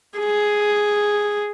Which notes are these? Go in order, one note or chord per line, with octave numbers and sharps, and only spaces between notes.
G#4